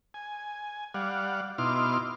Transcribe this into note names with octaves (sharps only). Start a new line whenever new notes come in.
G#5
G3 D5 F5 F#5
B2 D#4 E4 C6 D6 F6